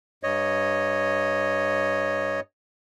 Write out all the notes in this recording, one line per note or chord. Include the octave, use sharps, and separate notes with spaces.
G2 C#5 D#5